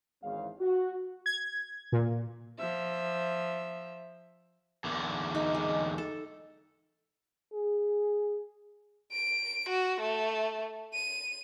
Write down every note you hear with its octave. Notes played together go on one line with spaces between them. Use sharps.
G#1 E2 C#4 F5
F#4
G#6
A#2
F3 E5
E2 D3
D#4
G#3
A4
G#4
D7
F#4
A3
D#7